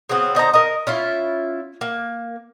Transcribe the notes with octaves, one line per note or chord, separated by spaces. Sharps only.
C#3 F#3 B3 C4
D3 D#4 C5 A#5
A#4 D#5
C#4 E4 F4
A#3